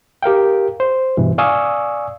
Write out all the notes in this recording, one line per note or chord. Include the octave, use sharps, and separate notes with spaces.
G4 A#4 F5 G5
C5
G2 B2 E3
D5 F5 G#5 C#6 D#6 E6